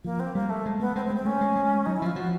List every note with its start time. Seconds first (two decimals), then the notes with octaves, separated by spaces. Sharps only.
0.04 F3 A#3
0.20 C4
0.35 G3 A#3
0.50 A3
0.66 G#3
0.80 A3 B3
0.95 G#3 C4
1.05 C4
1.10 G#3
1.16 C4
1.25 A3 C#4
1.41 G#3
1.56 G#3
1.86 F#3 D#4
1.96 E4
2.02 F3 F4
2.16 F3 F#4